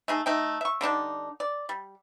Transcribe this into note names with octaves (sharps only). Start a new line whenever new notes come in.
A3 D#4 G#4
A3 D#4 G5
E5 C#6
D3 G3 D4 D#4
D5
G3